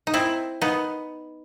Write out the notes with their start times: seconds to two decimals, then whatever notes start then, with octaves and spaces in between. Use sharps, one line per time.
0.07 D#4
0.14 C4 E4
0.62 B3 D#4